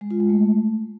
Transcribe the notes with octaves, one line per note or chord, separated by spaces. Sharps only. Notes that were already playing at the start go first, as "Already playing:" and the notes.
G#3
F4
G#3
A3